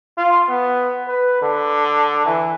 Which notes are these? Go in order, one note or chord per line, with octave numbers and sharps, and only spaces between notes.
F4
B3
B4
D3
E3